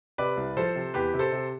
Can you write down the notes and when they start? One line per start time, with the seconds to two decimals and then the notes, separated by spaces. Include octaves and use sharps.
0.18 C3 B4 D5
0.37 C2
0.57 F3 A4 C5
0.76 C3
0.94 E2 G4 B4
1.14 C3
1.19 A4 C5
1.32 C3